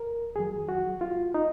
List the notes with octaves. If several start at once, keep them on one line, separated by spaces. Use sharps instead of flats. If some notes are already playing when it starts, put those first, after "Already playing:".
Already playing: A#4
F2 D#3 F#3 G#4
F#4
F4
D#4